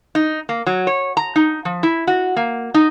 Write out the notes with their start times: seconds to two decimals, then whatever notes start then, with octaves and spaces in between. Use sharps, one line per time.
0.15 D#4
0.49 A#3
0.66 F#3
0.87 C#5
1.17 A#5
1.36 D#4
1.65 F3
1.83 E4
2.07 F#4
2.36 A#3
2.74 D#4